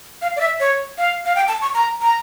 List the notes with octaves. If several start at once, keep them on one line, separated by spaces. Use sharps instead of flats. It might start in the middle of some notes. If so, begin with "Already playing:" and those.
F5
D5
E5
C#5
F5
F5
G5
A5
C#6
A#5
A#5